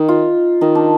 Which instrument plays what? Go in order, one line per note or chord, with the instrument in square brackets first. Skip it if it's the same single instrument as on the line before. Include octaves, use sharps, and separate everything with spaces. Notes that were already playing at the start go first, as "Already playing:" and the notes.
Already playing: [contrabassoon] D#3 [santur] D#4
[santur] F4
[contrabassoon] D#3 [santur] D#4
[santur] D4